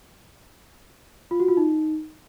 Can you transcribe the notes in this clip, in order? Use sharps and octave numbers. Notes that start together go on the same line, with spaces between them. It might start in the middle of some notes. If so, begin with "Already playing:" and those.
F4
F#4
F4
D#4